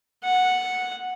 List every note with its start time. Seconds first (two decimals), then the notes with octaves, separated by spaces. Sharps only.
0.24 F#5